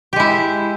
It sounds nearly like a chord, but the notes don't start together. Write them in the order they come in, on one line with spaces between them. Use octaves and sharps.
G4 G#3 E4